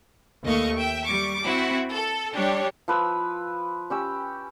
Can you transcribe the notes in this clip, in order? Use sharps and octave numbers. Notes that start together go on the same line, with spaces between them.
D#2 A3 D#5 F5 C#6
E5 G5
G3 C#6 D6
C4 E4 F#4
A4
G3 D4 G4 C#5
F3 B4 E6
C#4 G4 E6